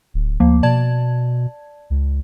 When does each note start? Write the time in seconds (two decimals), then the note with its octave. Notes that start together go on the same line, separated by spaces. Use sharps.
0.14 D1
0.40 D2 F3 A#3
0.63 B2 D5 A5 G#6
1.90 C#2